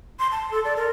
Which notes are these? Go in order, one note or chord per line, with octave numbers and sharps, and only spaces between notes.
C6
A5
A4
D5
A#4